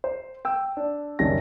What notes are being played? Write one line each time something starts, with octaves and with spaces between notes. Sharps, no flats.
C5
G5 E6
D4
F#1 D#3 G3 C#4 A5 A#6